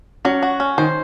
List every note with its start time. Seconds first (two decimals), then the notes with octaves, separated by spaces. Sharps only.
0.25 F#3 C#4
0.43 F#4
0.60 C#4
0.78 D#3 C5